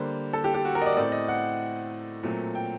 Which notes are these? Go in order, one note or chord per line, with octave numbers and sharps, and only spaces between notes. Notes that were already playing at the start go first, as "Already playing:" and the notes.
Already playing: D3 G3 A#3 C5
A4
G4
G4
F#4
A#4
D#5
D5
D#5
A2 A3 C4 D5
D#5
F#5
A#2 F#3 A3 C4
G5